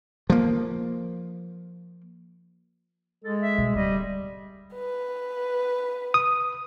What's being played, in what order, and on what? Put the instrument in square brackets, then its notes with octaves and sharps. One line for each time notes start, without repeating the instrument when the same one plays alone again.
[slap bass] F3 A#3
[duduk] G#3 [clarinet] A4
[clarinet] E5
[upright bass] B2 G3
[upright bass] D1 [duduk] G3 [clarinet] D#5
[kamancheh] B4
[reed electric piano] D#6